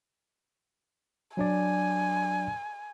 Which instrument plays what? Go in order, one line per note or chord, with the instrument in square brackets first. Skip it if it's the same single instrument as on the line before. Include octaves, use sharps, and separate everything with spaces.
[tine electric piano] F#3 D4 D5 [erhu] G#5